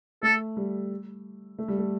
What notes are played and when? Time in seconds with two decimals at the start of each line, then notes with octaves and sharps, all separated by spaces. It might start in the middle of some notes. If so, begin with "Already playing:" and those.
0.23 A3 A4
0.57 G3
1.59 A3
1.68 G3
1.79 A3